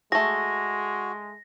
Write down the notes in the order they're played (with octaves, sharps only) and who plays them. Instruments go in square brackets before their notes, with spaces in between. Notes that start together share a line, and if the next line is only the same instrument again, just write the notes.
[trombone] G#3 [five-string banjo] A3 G#4 [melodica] F#4 [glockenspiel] A#6